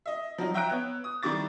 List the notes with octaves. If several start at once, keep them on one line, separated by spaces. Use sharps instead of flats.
D#5 E5
F3 F#3 D#4
E5 G5 A#5 E6 F#6 D7
B3 C#5
D#6
D#3 G3 E4 D6 A6